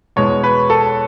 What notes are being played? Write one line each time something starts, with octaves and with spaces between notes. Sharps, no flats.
E2 B2 G#3 C#5
B4
A4